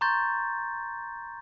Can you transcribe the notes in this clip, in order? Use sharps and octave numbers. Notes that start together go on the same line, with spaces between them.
A#5 C6 C#6 G6 A6